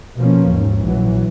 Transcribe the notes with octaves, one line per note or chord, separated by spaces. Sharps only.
B2 F3 A#3 C#4
D#2 G#2
A#1 E3 F#3